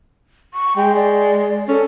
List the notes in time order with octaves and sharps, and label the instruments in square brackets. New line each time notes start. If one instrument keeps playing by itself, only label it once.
[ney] C#6
[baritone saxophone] G#3 [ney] G5
[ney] D5
[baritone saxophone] C#4 [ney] A4